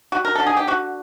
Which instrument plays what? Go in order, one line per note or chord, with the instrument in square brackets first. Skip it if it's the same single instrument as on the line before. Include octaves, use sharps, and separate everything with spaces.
[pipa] G3 F#4
A#4
D3 A4
G#4
G4
D3 F#4